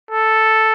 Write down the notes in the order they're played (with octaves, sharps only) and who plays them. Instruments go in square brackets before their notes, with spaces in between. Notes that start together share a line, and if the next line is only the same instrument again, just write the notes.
[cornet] A4